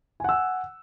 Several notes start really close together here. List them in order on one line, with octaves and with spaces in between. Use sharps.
G#5 F#5 E6